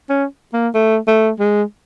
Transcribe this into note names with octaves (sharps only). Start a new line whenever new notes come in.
C#4
A#3
A3
A3
G#3